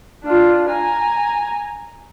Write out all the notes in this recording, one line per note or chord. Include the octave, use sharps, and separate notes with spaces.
D4 F4
G#5 A#5